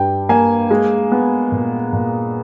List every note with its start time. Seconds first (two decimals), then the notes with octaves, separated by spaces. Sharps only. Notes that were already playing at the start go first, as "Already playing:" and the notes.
Already playing: G2 G3 G5
0.29 A#3 G#5
0.70 G#3
1.12 B3
1.52 A#2
1.93 A#2